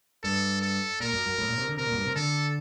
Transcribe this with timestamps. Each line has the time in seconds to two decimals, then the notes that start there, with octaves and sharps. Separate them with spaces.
0.23 G2 A4
0.62 A4
1.00 A#2 A#4
1.13 F#2
1.26 F#2
1.38 A2
1.48 A#2
1.58 C3
1.68 D3
1.77 C3 A#4
1.87 A#2
1.92 F#2
1.96 G2
2.05 C3
2.15 D3 A4